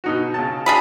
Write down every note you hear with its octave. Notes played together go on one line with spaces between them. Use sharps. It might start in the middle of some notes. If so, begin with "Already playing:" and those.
B2 D#4 F#4
C#3 A5
D4 F#4 G#4 B5